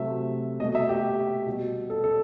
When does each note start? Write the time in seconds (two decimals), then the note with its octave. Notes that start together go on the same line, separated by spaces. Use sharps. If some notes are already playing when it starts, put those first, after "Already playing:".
Already playing: C3 F#3 A3 E5
0.60 B2 D#5
0.64 A3
0.75 E5
0.89 G4
1.47 B2 G3
1.90 A4
2.04 A4